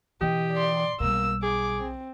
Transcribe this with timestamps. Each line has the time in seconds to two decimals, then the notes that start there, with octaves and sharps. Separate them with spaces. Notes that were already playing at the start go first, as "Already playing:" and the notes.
0.21 B2 D3 E3 G4 D#5 G5 D#6
0.53 D5 C6
1.00 B1 B2 G3 A#3 E6
1.43 G#4 D6
1.79 C4